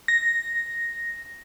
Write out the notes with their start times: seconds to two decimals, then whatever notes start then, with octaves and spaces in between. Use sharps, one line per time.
0.08 A#6